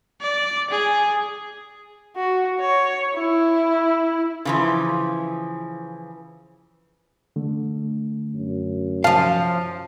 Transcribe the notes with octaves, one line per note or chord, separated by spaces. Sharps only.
D5
G#4
F#4
C#5
E4
C#3 E3 F3
D3 A3
F#2
F3 F5 A5